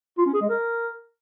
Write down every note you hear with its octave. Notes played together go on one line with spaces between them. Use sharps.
F4
C#4
G#4
G#3
A#4